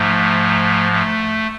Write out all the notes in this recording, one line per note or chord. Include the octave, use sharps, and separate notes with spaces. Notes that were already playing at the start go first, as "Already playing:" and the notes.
Already playing: G#2 F3 A3
A3